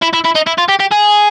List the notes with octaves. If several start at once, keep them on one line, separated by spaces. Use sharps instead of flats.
E4
E4
E4
D#4
E4
F4
G4
G4
G#4